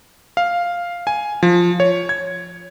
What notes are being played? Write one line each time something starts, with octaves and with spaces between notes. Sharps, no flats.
F5
G#5
F3
C#5
G#6